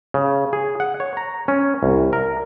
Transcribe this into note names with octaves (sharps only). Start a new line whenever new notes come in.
C#3
G#4
F#5
C#5
A#5
C#4
C2
A#4